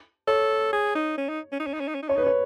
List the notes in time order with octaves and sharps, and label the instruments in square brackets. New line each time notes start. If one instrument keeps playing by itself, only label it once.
[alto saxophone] A4 [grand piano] C#5
[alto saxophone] G#4
D#4
C#4
D#4
C#4
D#4
C#4
D#4
C#4
D#4
C#4
D#4
[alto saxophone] C#4 [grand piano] C#5
[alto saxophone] D#4 [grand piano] B4
[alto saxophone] C#4
[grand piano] C#5